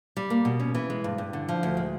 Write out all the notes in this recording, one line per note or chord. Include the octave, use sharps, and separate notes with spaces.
G3
A#3
B2
C#4
E3
G#3
G2
G2
D3
F3
D2
G#3